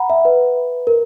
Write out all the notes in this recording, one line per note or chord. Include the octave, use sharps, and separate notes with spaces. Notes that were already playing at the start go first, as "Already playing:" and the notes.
Already playing: F#5 A#5 B5
E5
B4
A#4